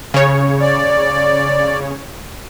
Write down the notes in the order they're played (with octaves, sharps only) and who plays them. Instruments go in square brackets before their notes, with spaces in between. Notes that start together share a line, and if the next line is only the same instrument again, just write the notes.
[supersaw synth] C#3 C#5
[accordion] D5